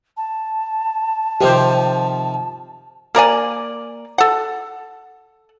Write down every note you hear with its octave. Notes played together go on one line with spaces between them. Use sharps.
A5
C3 D#3 F3 G4 C5
A#3 A#4 D5 G#5
A4 F#5